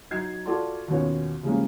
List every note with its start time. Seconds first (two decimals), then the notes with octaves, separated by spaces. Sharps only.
0.11 F#3 D#4 G#6 C7
0.46 F4 F#4 A4 D5 A5 C6
0.88 D#2 B2 B3 C#4 F4 C#5
1.43 C#3 F3 G3 G#3 A#3 C#4